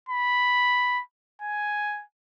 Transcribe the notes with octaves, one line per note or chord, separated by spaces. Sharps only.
B5
G#5